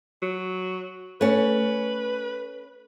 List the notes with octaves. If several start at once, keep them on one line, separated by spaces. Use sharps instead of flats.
F#3
A3 C#4 B4